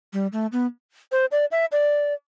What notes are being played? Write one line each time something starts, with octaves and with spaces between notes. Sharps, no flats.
G3
A3
B3
C5
D5
E5
D5